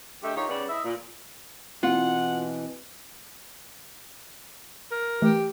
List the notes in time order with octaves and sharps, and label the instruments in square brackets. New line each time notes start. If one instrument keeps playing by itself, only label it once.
[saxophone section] D3 G#3 A3 G4
D#3 D#4 F4 G4 C#5
C#3 G3 B3 C#4 D5
E4 D#5 E5
A#2
[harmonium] B2 E3 [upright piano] C4 E4 [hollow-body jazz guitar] F4 [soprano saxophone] F#5
[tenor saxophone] A#4
[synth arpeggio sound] E3 A3 [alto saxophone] G4